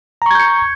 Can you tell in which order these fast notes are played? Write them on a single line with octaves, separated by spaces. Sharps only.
A#5 C#6 G#6 G6 C#7